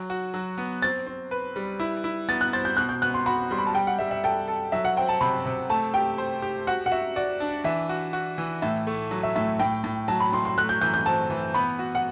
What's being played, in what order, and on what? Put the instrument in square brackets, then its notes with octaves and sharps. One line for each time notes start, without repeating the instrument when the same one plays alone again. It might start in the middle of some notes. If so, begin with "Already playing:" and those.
Already playing: [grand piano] F#3
F#4
F#3
B3
[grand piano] C4 [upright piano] A6
[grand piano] C4
B4
G3
E4
E4
[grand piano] B3 [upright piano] A6
[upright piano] F#6
[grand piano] C5 [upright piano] A6
[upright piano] G6
[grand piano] B2 [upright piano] F#6
[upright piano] G6
[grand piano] B3 [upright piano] F#6
[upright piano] C6
[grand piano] F#4 [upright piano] B5
[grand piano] G3 [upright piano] C6
[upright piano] B5
A5
[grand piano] G3 [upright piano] G5
[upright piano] F#5
[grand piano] G3 [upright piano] E5
[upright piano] E5
[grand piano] A4 [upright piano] G5
[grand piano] A4
[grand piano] F#3 [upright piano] E5
[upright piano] F#5
[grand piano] C4 [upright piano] G5
[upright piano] A5
[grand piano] C3 [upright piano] B5
[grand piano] C3
[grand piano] A3 [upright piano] A5
[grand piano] G4 [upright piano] G5
[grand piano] C5
G4
[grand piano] F#4 [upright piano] F#5
[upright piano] F#5
[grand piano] F#4 [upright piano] E5
[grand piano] F#4 [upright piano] D5
[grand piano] D4
[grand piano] E3 [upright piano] E5
[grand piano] F#4
F#4
E3
[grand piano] A2 [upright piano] E5
[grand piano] A3
F#3
[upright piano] E5
[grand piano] A2 [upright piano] E5
[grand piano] A2 [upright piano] G5
[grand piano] A2
[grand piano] F#3 [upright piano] A5
[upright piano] B5
[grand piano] A2 [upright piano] C6
[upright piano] C6
[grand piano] A3 [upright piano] F#6
[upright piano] G6
[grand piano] E3 [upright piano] G6
[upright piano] G6
[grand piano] C4 [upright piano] A5
[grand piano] E3
[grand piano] B3 [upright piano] B5
[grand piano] F#4
[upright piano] F#5